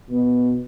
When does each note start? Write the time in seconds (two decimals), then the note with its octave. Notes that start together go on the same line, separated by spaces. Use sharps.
0.09 B2